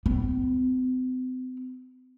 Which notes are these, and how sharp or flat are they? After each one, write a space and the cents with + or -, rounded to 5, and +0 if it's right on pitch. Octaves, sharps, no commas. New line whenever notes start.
C4 -40